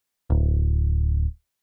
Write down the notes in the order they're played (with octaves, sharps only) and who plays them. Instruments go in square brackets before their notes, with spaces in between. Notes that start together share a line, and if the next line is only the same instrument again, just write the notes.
[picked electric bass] D1